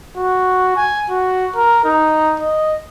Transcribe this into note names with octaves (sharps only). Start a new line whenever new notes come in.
F#4
G#5
F#4
A#4
D#4
D#5